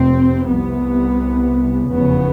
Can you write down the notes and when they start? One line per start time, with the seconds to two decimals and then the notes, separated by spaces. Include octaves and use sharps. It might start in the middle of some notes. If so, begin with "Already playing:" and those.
Already playing: F1 F2 C3 C4
0.48 C2 C3 B3
1.89 F1 E2 C#3 B3